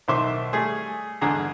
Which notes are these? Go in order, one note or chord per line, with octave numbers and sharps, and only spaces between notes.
B1 D#3 C5 E5 C6 D6
G3 A3 G#4
G#1 E2 G2 D3 G#4 A#5